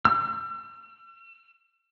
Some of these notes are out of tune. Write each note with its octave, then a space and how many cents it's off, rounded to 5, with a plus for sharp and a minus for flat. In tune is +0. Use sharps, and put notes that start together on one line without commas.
E6 +45